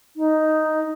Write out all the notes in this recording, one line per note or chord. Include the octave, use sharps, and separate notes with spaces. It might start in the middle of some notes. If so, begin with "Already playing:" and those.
D#4